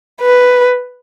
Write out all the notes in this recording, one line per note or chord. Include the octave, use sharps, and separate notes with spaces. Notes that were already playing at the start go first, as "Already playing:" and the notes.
B4